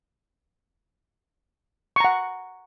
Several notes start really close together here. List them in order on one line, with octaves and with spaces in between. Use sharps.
C#6 A#5 F#5